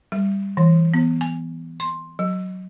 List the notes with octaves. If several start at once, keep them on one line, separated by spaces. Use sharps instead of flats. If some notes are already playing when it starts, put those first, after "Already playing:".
G3
E3
B3
G#5
C6
F#3